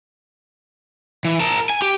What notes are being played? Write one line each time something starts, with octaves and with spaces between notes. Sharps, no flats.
E3
A#4 A5
G#5
G4